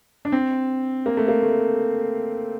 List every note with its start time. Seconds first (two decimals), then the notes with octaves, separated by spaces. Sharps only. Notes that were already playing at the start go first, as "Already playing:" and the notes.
0.25 D4
0.32 C4
1.06 A#3
1.17 A3
1.28 A#3
1.42 A3